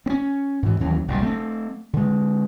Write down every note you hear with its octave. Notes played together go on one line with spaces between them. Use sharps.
C4 C#4
G#2 E3
D#2 E3 F#3 C#4
F#1 C2 A#2
A3 C4
D3 G#3